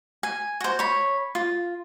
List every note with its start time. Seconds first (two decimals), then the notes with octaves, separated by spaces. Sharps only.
0.23 G#5
0.60 F#4 C5
0.79 C#5 B5
1.35 F4